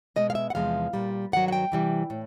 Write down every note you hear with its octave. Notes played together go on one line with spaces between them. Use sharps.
B2 G#3 D#5
F5
E5
F#5
E2 C3 F3 G#3 F5
A#2 G3
G2 D#3 F#3 F#5
F#5
G5
C3 E3 G3
A2